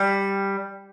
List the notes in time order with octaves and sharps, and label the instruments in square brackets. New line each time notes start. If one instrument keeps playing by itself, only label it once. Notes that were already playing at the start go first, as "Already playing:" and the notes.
Already playing: [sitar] G3